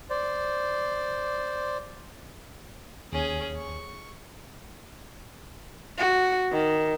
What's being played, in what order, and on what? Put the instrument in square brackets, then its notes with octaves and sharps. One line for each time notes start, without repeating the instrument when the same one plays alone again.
[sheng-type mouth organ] C5 D5
[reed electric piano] D#2 [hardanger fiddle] C#4 G#4
[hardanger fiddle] C#6
[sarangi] F#4
D#3